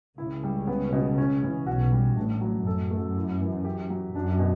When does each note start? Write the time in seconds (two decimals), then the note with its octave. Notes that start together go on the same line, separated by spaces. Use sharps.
0.18 C#2 C#3 E4
0.43 G3
0.67 B3
0.92 B2
1.18 C#4
1.43 E3
1.66 B1 B2 F#4
1.92 G3
2.17 A1 A2 D4
2.41 F#3
2.66 F#2 A4
2.91 A3
3.16 E4
3.40 E3
3.65 G4
3.90 F#3
4.15 F#2 D4
4.39 B2